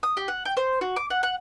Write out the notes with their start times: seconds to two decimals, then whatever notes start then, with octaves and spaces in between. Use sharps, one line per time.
0.03 D#6
0.17 G4
0.28 F#5
0.45 G5
0.57 C5
0.81 F#4
0.96 D6
1.10 F#5
1.23 F#5